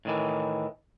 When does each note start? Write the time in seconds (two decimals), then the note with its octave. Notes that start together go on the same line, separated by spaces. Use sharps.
0.05 A2 D#3 E3